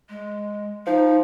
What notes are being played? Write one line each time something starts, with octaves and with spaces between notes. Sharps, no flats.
G#3
F3 D#4